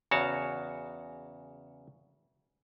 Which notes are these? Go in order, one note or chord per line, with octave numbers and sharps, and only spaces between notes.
E2 C#3 F#4 C#5 A5